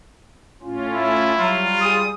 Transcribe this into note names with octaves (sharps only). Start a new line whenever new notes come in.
A2 C#4 F4
E4
F#3 G3 F4
G#4 D#6